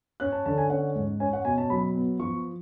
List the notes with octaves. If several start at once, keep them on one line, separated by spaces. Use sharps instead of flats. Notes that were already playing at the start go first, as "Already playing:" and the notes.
C#4 F#6
A5
D3 A5
G#5
C#4 F#5
G#2
C#4 G#5
F#5
B2 G#5
A5
F#3 B5
B3
F3 C#6